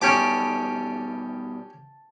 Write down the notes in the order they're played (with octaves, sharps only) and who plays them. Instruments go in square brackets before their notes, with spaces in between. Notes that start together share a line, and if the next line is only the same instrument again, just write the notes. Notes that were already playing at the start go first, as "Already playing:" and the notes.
[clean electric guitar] B2 D#3 G3 [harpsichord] C#4 G4 D6 [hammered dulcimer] A5